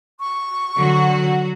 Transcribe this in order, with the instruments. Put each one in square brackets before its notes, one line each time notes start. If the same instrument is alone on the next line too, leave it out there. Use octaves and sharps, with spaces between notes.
[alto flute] C#6
[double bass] D3 [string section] F#3 F#4